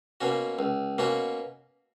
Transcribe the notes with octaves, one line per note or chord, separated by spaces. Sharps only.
B2 A#3 C#4 F#4
C#2
B2 A#3 C#4 F#4